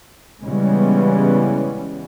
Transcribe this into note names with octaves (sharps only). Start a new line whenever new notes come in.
C#3 E3 G3 G#3 B3 C#4